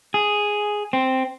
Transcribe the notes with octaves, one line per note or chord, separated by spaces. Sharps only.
G#4
C4